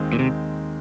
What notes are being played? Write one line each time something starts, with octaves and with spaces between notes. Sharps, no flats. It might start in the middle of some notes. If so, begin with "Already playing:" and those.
Already playing: D#2 D#3 G#3 C4 D#4
A#2
C3